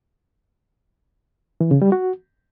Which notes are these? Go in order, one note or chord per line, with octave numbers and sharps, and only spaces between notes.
E3
C#3
G3
F#4